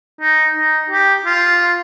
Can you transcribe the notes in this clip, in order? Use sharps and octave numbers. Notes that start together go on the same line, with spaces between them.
D#4
D#4
G4
F4